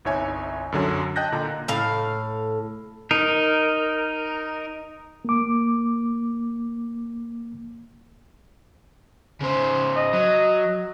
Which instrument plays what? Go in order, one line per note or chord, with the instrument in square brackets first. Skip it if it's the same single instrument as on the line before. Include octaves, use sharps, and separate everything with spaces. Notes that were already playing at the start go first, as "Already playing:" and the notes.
[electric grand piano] G1 C2 D#4 C#5 E5 G#5
F#2 D3 F#3
D#5 G5 A5 F#6 G6 A#6
A#2 D3 A#5
[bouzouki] A2 F5
[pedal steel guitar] D#4 A#4
[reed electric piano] A#3 D6
[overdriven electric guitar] C#3 C5
[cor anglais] D#5
[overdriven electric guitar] F#3